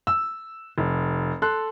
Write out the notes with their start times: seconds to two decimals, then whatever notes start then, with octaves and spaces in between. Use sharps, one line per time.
0.07 E6
0.78 F1
1.42 A4 C6 F#6